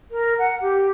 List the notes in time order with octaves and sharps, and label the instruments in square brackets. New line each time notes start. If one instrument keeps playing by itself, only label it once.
[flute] A#4
F#5
G4